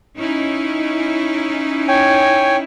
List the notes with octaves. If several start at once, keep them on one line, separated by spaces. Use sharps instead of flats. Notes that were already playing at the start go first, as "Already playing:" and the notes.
C#4 D#4 E4
C#5 G5 G#5